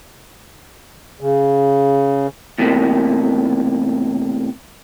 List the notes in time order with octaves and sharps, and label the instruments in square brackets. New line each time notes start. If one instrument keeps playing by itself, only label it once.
[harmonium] C#3
[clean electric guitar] E2 A2 C3 A#3